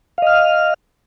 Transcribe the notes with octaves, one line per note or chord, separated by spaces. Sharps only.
D#5 F5 F6